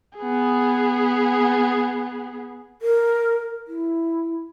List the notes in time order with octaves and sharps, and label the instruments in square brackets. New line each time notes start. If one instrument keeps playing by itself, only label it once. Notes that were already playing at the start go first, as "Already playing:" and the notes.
[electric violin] B3 G#4
[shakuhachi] A#4
E4